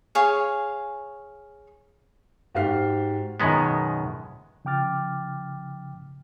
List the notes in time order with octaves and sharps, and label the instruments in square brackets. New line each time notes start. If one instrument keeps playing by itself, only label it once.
[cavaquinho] G#4 C#5 F5
[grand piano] G#2 F#4 G4 C5 F6 C7
[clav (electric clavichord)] F#2 B2 D#3 G#3 B3
[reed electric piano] C#3 F3 G5 D6 F6 A6